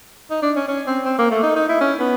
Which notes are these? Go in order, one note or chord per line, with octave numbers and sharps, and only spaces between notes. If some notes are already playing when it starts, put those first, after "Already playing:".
D#4
D4
C#4
C#4
C4
C4
A#3
A3
D#4
D#4
E4
C#4
B3